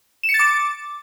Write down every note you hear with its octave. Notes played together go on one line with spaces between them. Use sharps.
E7
C#7
A6
D6